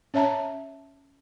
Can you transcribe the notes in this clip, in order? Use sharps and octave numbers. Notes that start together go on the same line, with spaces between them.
C#4 C#5 E5 A5 A#5